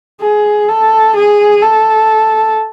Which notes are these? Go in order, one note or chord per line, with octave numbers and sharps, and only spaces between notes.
G#4
A4
G#4
A4